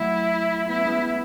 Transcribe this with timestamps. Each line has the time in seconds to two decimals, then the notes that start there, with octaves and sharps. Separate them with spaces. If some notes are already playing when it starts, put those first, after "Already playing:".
Already playing: F#3 A3 E4
0.68 B3 E4
0.77 C#4
0.85 G#3 B3